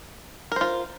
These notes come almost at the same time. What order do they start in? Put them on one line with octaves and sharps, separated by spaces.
A#4 C5 F4